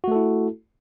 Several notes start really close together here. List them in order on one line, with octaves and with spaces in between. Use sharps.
F#4 A3 A4 E4